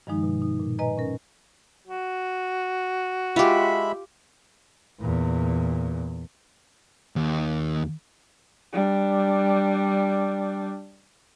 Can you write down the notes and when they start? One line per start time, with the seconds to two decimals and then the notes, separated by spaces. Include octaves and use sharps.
0.07 G2 D#3 F3 G#3 D#4
0.23 B2
0.42 D#4
0.60 A#2
0.79 B4 D#5 G#5 A#5
0.97 C#4 A#4
1.88 F#4
3.36 G#3 F4 G4 E5 B5
5.00 E2 A#2
7.16 D#2
8.73 G3 D4